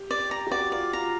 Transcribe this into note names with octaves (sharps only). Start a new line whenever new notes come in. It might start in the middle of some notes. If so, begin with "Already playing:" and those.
Already playing: G4
D5
A#5
G4
F#4 D5
F4 D5
F4 A#5